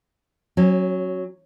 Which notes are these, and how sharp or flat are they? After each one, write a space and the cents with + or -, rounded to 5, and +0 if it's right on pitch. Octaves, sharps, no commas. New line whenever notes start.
F#3 +0 C#4 -30